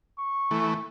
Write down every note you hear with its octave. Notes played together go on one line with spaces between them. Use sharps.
C#6
E3 A3